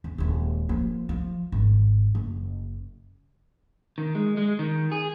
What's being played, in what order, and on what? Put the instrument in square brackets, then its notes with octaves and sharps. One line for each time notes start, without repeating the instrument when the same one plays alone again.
[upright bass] E2
D#1 G#3
F3 A#3
F3
G#1
F#1
[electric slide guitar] D#3
G#3
G#3
D#3
G#4